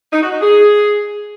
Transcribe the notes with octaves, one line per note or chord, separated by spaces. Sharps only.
D#4
F#4
D#4
G#4